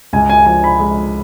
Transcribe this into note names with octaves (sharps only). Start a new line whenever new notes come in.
C#2 G#5
G#5
F3 G#5
B5
G#3